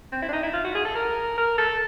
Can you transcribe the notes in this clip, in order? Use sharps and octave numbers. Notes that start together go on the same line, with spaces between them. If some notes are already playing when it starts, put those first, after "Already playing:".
C4
E4
D4
D#4
E4
F4
F#4
G#4
A4
A#4
A#4
A4